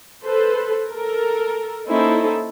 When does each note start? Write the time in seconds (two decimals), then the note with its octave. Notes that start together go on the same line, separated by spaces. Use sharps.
0.23 A4 B4 C5
0.91 A4 A#4
1.88 A#3 C#4 D#4 E4 A4 C5